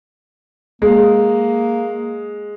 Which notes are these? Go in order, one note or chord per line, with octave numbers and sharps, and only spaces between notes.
G#3 A#3